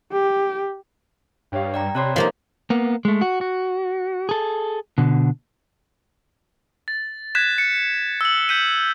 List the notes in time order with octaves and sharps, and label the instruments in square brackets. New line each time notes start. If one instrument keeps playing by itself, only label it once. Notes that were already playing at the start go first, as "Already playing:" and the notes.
[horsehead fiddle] G4
[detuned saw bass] G2 [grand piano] G4 C#5 F5
[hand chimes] D5 G5 A#5
[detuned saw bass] C3 [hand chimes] C#5 D5 A5 [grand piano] B5 C6 F#6
[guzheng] F3 A#3 D#4 [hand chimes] D#5 F5
[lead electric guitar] A#3 B3
G#3 A3
F#4
F#4
G#4 A4
B2 D3
[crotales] A6
F#6 G#6 B6 E7
C#7
E6 F#7
G6 B6 D#7